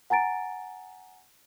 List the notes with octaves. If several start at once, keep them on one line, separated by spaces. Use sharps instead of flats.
F#5 G#5 A#5 A6 D7